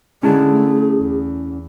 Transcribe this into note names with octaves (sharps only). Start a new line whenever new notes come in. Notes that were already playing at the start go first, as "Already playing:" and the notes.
D3 G#3 C#4 E4 G#4 A5
A3
E2